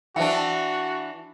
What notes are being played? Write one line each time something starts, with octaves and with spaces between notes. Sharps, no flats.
E3 D4 F#4 C5 E5 G5